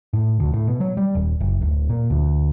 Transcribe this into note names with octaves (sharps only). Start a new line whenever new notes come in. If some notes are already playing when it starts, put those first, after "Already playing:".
A2
D2
A2
B2
F#3
G3
D#1
F#1
D1
A#2
D2